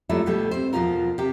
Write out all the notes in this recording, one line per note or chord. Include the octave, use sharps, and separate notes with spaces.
F#3 G3 A3 B3 E4 F4
D2 B2 G3 A3
C4 C5
E2 B2 F3 F4 A#4
C3 G4